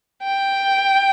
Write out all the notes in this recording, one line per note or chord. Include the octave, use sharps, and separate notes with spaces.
G5